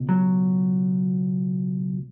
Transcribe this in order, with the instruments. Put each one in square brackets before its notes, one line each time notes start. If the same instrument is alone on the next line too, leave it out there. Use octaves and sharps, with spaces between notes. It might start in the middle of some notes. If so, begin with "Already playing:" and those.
Already playing: [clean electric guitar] C#2 B2
F#3